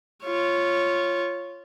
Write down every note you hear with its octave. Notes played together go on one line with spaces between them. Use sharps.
F4 C#5